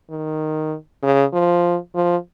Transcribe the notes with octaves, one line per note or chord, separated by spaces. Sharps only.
D#3
C#3
F3
F3